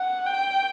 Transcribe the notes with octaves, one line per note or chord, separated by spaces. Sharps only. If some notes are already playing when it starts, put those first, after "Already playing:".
Already playing: F#5
G5